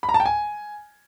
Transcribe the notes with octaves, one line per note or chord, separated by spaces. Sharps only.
B5
A#5
A5
G5
G#5